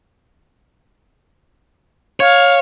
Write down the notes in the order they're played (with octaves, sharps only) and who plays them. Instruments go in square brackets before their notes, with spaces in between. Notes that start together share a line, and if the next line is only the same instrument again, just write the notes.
[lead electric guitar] C#5 [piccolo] F5